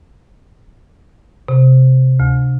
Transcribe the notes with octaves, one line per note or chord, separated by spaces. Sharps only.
C3
D2